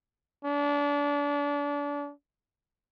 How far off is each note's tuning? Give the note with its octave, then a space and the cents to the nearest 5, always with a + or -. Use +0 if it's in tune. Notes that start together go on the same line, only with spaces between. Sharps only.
D4 -30